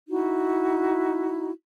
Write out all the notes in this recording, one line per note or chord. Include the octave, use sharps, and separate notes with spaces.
D#4 E4 F#4